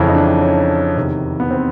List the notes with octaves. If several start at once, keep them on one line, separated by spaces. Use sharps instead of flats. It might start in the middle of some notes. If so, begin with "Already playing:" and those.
Already playing: F2 C#3 E3
D#4
D4
C#4
E2 C3 D#3
B3
C4